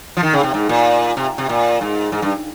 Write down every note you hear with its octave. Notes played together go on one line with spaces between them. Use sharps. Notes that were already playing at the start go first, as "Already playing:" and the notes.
F3
D#3
C#3
C3
G#2
A#2
C3
C3
A#2
G#2
G#2
G2